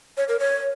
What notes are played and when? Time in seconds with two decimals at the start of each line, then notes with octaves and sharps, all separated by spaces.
0.17 C#5
0.28 A#4
0.39 C#5